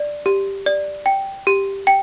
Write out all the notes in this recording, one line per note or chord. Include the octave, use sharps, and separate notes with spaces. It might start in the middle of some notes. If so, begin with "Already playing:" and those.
Already playing: D5
G4
D5
G5
G4
G5